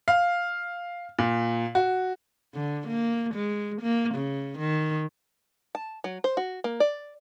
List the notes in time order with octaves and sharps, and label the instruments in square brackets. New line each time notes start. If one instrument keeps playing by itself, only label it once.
[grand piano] F5
A#2
F#4
[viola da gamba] D3
A#3
G#3
A#3
C#3
D#3
[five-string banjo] A5
F#3
C5
F#4
A#3
D5